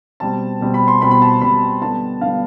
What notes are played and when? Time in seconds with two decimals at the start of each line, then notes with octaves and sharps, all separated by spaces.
0.20 B2 G3 C4 A5
0.61 B2 G3 C4
0.74 B5
0.88 C6
1.01 B2 G3 C4 B5
1.11 B5
1.22 A5
1.41 B2 G3 C4 B5
1.81 D3 G3 B3 D4 A5
2.21 D3 G3 B3 D4 F5